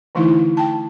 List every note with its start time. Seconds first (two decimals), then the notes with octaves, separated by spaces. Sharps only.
0.15 D3 E3 A3 D#4 E4
0.57 G5 A5